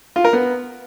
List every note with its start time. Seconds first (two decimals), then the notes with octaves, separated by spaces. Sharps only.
0.16 F4
0.24 A#4
0.33 B3